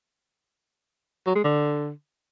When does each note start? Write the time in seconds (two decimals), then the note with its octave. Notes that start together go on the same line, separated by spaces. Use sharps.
1.27 F#3
1.35 G#3
1.44 D3